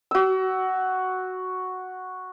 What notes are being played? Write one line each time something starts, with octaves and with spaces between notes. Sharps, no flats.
F#4 E6